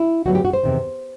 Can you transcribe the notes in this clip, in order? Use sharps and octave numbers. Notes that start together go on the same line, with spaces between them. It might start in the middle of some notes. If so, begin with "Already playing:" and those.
Already playing: E4
D2 D3 F#3 B3 F#4
G4
F#4
C5
E2 C3 D#3